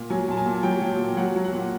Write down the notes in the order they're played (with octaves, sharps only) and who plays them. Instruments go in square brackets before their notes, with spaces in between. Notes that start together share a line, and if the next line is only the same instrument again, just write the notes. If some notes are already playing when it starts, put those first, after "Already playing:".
Already playing: [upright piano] A#2
F#3 G#5
A#2 A5
G#5
A#2
F#3 G5
F#3
A#2
F#3 F#5
F#3
F#5
A#2